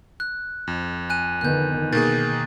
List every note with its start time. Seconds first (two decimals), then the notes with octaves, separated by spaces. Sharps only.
0.20 F#6
0.67 F2
1.10 G#5 F#6 D#7
1.41 D3 D#3 B3 F#6 G6
1.93 B2 D#3 A#3 G#4 A6